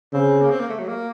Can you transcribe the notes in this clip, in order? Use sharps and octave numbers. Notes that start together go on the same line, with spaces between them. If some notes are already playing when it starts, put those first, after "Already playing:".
C#3 C4
A#3
C4
A#3
A3
F#3
A#3